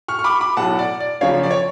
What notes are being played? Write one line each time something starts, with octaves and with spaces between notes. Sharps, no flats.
C#6 F6
C#6
B5 D6
B5 D6
B1 A2 F#3 F#5 A5
D5
D5
F#2 C#3 F3 C#5 F5
D5
C#5